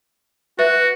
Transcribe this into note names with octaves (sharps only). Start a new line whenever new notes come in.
F#4 B4 E5